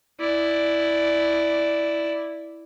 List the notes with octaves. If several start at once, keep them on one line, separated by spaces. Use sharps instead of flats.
E4 D5